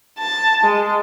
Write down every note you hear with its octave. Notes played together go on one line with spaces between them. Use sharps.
A5
G#3